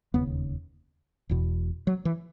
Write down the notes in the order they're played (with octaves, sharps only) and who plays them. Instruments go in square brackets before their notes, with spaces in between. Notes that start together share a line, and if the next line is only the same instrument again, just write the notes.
[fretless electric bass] E1 D#2 C#3 B3
E1 E2 B2
F#3
E3